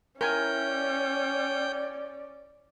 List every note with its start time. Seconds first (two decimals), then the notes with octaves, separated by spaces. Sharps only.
0.21 C#4 E4 A#4 G5 G#5
0.73 D5